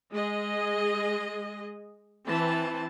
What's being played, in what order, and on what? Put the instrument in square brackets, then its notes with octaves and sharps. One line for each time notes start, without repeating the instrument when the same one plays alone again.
[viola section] G#3 G#4 D#5
E3 C4 A5